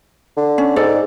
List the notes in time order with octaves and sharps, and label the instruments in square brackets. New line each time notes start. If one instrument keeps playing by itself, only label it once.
[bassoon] D3
[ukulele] C#4
[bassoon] G#2 [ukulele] A4 D5